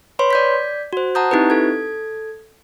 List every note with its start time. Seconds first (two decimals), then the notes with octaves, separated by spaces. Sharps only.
0.19 B4 C#5 B5 C6
0.30 D5 G6 B6
0.93 F#4 C5
1.15 F#5 A5 A#5 D#6 G6
1.31 C4 D#4 E4 G4 B4
1.50 A4 G#6